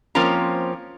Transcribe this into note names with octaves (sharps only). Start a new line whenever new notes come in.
F3 A#3 C4 C#4 A#5